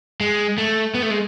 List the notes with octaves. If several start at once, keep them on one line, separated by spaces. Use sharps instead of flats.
G#3
A3
B3
A3
G#3